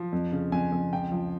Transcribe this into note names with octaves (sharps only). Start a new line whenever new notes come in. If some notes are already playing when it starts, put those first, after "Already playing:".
Already playing: F3
F2
C#3
F2 G#5
F2
C#2 G5
F3